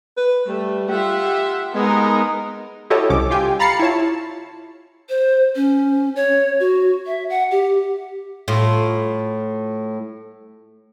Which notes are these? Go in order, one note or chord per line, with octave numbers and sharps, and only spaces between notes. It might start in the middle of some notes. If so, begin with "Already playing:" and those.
B4
G3 A3
F4 G4 E5 F#5
G#3 B3 D#4 A#4
E4 F#4 G4 A4 C#5 D#5
C2 C3 C#4 D6
F4 G4 G5 G#5
F5 A#5 B5 A6 C7 C#7
E4 F4 C#5 A5
C5
C#4
C#5
F#4
E5
F#5
G4
A2 F4